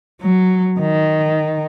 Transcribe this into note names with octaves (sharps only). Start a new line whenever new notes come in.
F#3
D#3